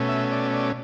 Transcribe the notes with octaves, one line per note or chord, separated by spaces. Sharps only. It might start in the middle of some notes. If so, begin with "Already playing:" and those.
Already playing: B2 A3 C#4
E5
D5
D5